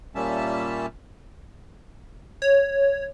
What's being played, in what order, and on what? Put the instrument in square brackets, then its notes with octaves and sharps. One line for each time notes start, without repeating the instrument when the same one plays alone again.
[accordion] A#2 G3 A#3 C#4 E5 A5
[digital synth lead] C#5